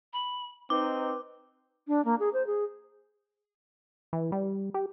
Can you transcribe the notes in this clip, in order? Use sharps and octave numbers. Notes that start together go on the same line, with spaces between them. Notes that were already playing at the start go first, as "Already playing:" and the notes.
B5
C4 D#4 B4 D6
D4
A#3
G#4
C5
G#4
E3
G3
G4